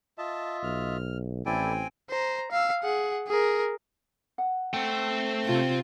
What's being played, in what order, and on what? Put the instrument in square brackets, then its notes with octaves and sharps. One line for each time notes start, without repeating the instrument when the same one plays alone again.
[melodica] F4 D#5 E5 [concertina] A5
[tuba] B1 [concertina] F6
[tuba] A1 [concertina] C4 G5 G#5 [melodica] E4 A4 D5
[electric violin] C5 A#5
F5 E6
G#4 F#5
G#4 A#4
[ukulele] F#5
[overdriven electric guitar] A3 [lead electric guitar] C5 G5
[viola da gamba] C3 F4